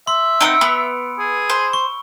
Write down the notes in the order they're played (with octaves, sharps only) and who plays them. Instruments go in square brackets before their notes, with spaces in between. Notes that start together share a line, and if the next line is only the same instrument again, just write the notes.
[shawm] E5 [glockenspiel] C6
[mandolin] B3 C4 D#4 [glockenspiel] E6 C#7 D7
[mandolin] B3 [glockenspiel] B5
[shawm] G#4
[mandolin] C5
[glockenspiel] C#6